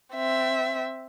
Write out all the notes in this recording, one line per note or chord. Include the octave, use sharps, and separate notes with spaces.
C4 E5